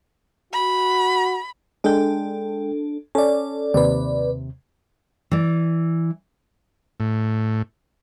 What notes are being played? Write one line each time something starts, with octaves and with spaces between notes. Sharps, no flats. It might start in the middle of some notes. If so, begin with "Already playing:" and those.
F#4 B5
G#3 D4 A4 G5
C#4 A4 D5
D#2 C3 B4 D5
E3 D5
A2